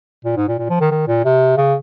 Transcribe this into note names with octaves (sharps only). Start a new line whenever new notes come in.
A#2
G#2
A#2
A#2
F3
D#3
D#3
A#2
C3
C#3